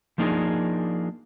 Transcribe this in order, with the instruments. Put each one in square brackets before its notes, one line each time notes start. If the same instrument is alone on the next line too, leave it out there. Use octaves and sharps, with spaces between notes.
[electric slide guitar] F3 A#3 D4 D#4 F4 G#4